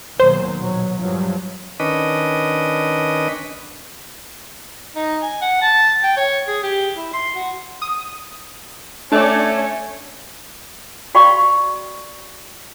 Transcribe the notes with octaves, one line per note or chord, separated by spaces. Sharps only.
D#2 B2 F#3 C5
A#1 B2 F#3
G2 F3 F#3
D#3 C#4 D4 B4 D#5
D#4
G#5
F#5
A5
G5
C#5
G#4
G4
E4
C6
F#4
D#6
A3 C#4 D4 C#5 D5
F#4 D5 F5 G5 B5 C#6